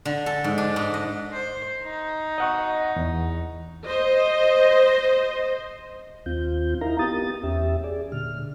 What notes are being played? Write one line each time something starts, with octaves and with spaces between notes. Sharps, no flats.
D3
A4
G#2
D4
G#2
D#5
C5
D#4
D#5 F#5 C#6
E2
C5 D#5
D#2 C4 F4 G6
D#4 E4 A#4 F5 A#5
B3 G4 D#6 A6
E2 C#4 G4 E5
G#4 D5
A#2 D3 F6